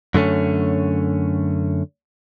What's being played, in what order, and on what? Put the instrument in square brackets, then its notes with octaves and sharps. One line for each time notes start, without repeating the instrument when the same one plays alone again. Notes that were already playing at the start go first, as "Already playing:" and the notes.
[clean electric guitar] F#2 D3 A3 C#4